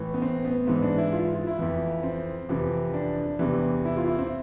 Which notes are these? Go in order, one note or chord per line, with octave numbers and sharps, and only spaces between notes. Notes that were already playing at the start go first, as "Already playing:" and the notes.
Already playing: A2 E3
B3
C4
B3
G#2 E3 C4
D4
E4
F4
F4
E4
F2 E3
C4
F2 C3 E3
D4
E2 C3 E3
E4
F4
E4
C4